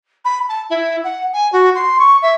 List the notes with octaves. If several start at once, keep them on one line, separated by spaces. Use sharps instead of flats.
B5
A5
E4
F#5
G#5
F#4
C6
C#6
E5